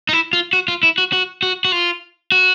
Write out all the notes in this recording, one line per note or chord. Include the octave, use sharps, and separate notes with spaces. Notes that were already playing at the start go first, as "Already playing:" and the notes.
D#4
E4
F4
F#4
F4
E4
F#4
F#4
F#4
F#4
F4
F#4